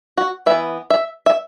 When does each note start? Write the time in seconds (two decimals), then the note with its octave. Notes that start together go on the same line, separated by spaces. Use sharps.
0.18 F#4
0.46 E3 B3 E5
0.90 E5
1.26 E5